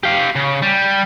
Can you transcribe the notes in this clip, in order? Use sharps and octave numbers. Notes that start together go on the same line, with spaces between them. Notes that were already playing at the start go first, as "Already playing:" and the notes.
G4 F5
C#3
G3